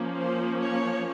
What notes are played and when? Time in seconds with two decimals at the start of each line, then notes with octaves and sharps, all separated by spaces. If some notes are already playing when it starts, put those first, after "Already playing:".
Already playing: F3 A#3 C#4
0.14 C5
0.60 C#5